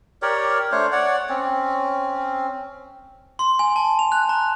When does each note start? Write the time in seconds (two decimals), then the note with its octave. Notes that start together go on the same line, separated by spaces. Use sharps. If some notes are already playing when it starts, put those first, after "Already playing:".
0.22 G4 A#4 C#5 D5
0.72 A3 D4 C5 C#5
0.92 C#5 D5 F#5
1.29 C4 C#4
3.39 C6
3.59 G#5
3.76 A5
3.99 F7
4.12 F#6
4.29 A#5